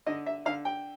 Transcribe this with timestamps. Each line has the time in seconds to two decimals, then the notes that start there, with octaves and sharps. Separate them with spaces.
0.06 D3 D#5
0.26 E5
0.46 D3 F5
0.65 G5